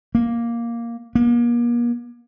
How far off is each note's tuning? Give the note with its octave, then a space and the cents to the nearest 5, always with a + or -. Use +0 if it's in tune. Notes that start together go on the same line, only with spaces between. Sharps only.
A#3 +5
A#3 +40